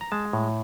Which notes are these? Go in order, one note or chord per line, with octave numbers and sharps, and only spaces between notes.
A#5
G#3 A5
A2